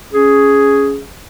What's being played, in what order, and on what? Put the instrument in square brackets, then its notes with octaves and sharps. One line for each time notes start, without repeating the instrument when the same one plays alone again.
[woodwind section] C#4 G#4